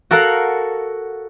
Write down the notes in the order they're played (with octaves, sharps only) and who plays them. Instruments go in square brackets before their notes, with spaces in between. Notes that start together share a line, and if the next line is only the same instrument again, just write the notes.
[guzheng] F#4 A4 A#4 F5 F#5